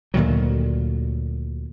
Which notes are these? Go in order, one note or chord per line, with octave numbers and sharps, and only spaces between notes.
D2 A#2 D#3 F#3